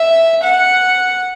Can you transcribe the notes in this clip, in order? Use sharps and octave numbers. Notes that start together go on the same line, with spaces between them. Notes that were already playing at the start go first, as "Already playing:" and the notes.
Already playing: E5
F#5